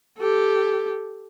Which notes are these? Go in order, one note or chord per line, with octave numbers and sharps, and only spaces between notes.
G4 A4